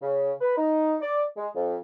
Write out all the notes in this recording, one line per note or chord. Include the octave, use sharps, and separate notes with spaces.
C#3
B4
D#4
D5
G#3
F2